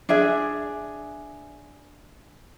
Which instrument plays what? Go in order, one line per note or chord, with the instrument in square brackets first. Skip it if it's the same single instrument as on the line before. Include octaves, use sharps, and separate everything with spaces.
[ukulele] D4 G#4 E5